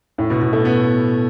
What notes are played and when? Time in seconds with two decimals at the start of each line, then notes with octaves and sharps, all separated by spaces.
0.18 A2
0.30 B2
0.41 B2
0.53 A3
0.65 B3